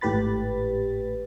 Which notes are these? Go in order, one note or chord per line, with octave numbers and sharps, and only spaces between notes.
G#1 A2 G4 B4 B5 A6